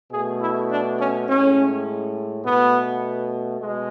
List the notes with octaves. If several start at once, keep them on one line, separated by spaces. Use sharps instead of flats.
B2 A3 G#4
E4
D4
C#4
A2 G#3 C#4
B2 A3 B3
B2 G#3